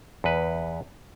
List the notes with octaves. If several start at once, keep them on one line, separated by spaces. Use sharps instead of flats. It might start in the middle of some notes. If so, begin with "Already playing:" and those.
E2 B4